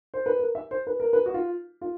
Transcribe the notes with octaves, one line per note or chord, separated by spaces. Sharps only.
C5
B4
A#4
E5
C5
B4
A#4
B4
F#4
F4
F4